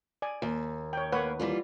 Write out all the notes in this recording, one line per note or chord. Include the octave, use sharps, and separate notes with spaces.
D5 G#5
D#2
C#5 G5
A#3 B4 C#5 F#5
E3 G3 F4